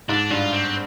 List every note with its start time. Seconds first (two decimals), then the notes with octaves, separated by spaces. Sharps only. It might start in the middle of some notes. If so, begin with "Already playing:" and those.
0.09 G#2 D4
0.31 G2 F4
0.53 C4